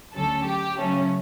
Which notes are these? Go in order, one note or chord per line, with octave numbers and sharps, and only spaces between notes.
D2 D3 F#3 C#4 A4
G4
C#3 F#3 A3 C#4